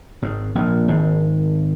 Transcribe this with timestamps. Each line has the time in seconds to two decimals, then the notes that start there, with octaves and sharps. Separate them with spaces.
0.22 G#1 G#2
0.55 A#1 A#2
0.88 G#1 G#2